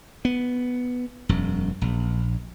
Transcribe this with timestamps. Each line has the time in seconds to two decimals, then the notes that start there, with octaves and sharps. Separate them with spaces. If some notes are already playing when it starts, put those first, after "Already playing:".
0.25 B3
1.29 E1 F#2
1.82 A#1